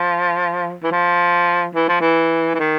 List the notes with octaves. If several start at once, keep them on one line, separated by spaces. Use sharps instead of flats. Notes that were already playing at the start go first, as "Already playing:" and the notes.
Already playing: F3
E3
F3
E3
F3
E3
E3
D#3